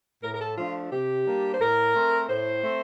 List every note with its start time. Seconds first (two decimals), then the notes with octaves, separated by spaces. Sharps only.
0.23 A2 A#4
0.34 A#4
0.41 A4
0.58 F3 A3 D4 F4
0.92 C3 G4
1.27 G3 A#3 D4
1.54 C5
1.60 A2 A#4
1.95 A3 C4
2.29 A2 C5
2.63 A3 C4